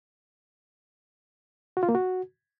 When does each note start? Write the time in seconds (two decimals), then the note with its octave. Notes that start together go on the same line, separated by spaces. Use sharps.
1.77 F#4
1.83 F4
1.89 A#3
1.95 F#4